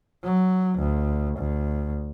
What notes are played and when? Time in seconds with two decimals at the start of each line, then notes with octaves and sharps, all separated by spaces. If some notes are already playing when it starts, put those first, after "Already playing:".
0.24 F#3
0.79 D2
1.38 D2